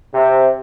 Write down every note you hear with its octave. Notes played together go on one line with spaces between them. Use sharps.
C3